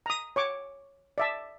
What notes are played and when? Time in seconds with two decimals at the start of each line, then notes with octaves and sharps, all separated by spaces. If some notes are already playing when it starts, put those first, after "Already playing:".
0.06 A#5 D#6
0.36 C#5 C#6 D6
1.18 D5 E5 A5